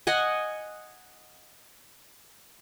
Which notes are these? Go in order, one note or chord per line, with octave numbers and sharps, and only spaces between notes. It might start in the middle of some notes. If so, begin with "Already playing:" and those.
D#5 F#5 G#5